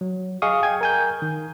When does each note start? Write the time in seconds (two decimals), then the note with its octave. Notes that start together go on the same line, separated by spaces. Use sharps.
0.01 F#3
0.42 G#4 D#5 F5 C#6 D#6
0.63 G5 G#5 G#6
0.81 A#4 G#5 G6
1.22 D#3